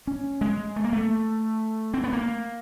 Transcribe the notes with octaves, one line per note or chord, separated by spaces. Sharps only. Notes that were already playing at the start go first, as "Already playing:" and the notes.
C#4
G#3
A3
A#3
A3
C4
B3
A#3